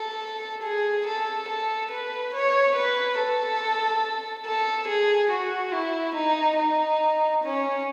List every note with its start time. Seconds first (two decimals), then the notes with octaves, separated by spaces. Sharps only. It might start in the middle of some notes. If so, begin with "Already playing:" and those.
Already playing: A4
0.64 G#4
1.07 A4
1.48 A4
1.91 B4
2.34 C#5
2.76 B4
3.18 A4
4.46 A4
4.88 G#4
5.31 F#4
5.73 E4
6.15 D#4
6.58 D#4
7.44 C#4